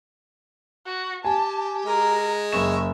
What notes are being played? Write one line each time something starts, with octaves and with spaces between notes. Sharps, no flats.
F#4
G4 G#5 A5
G#3 A#4
F#1 E5 C#6 E7